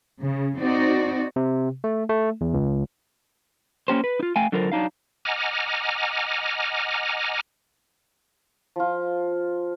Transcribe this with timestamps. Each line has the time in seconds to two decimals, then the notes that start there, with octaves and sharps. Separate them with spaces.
0.21 C#3
0.59 C4 D#4 F#4 D5
1.36 C3
1.84 A3
2.09 A3
2.41 E2
2.54 C#2
3.88 A#3 C#4 G4 C5
4.04 B4
4.19 D#4 F4
4.36 A3 F5 G5 G#5
4.52 D3 F#3 F4 A4 A#4 C5
4.72 F#3 D4 D#4 F5
5.25 D#5 F#5 G#5 A#5 D6 F6
8.76 F3 F4